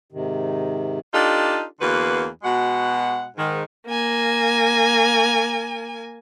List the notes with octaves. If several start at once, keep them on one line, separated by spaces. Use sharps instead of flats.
G#2 C3 D#3
D4 D#4 F4 G4 A4
E2 D3 A#3 F#4 B4
B2 G#3 F#4 F#5
G#2 D#3
A#3 G#5